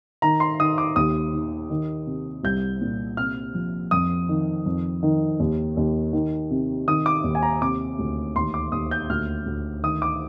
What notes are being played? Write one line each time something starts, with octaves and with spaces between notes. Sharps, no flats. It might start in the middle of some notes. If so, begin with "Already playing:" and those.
D#3 A#5
C6
D#3 D#6
D6
D#2 D#6
D#3
D#3
C3
C2 G6
A#2
C3 F6
F3
F2 D#6
D#3
F2
D#3
D#2
D#2
D#3
C3
D#3 D#6
D6
D#2
G#5
A#5
C3 D6
D2
D#2 C6
D6
D#2 D#6
G6
D2 F6
D2
D#3 D#6
D6